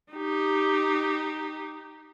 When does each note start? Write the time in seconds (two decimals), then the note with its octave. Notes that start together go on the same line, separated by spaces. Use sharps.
0.13 D#4 G4